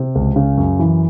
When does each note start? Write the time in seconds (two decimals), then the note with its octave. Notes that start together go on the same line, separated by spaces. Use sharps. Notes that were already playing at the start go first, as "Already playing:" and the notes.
Already playing: C3
0.15 C#2
0.36 C#3
0.57 F#2
0.79 E3